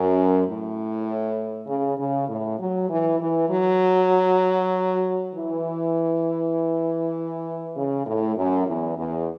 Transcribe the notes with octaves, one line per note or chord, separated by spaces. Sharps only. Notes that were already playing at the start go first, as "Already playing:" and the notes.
Already playing: F#2
A2
C#3
C#3
A2
F#3
E3
E3
F#3
E3
C#3
A2
F#2
E2
E2